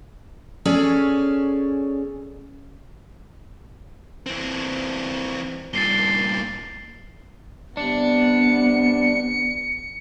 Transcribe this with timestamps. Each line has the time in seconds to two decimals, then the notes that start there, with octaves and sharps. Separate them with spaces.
0.65 C#4 G#4 A4 C#5 D5 G#5
4.26 E3 C4
5.73 G2 A#2 A6 C7 G7
7.77 C3 G3 B3 D4 C#7